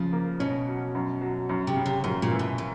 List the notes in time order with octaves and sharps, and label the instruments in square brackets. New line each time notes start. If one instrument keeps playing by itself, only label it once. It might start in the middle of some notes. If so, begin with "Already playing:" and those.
Already playing: [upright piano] C#3 [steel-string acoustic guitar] F3
[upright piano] A#3
[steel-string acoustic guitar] B2 [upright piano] C#4
[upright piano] F#3
F#2
F#3
F#2
[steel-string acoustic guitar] C3
[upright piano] C#3
[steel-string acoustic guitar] C3
[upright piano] F#2 [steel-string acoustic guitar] A#2
[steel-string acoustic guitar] A#2
[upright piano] E3
[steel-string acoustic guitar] B2
A#2